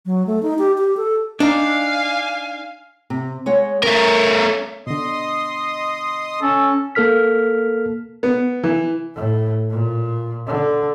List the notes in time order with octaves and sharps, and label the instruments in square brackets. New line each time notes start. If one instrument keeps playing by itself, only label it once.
[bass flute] F#3
A3
D#4
G4
G4
A4
[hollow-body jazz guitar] D4 D#4 [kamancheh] F5 G#5
[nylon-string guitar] C3
G#3 C#5 F#5
[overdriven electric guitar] A3 A#4 [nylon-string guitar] C#4
[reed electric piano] B2 D3 [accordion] D#5 C6 D#6
[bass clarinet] C#4 [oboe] A4
[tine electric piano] A#3 A4 A#4 F6 B6
[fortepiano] B3
E3
[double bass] A2
A#2
D3